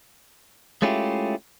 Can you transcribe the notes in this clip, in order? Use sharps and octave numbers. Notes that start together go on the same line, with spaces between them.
G#3 A3 C#4 E4 F4 G4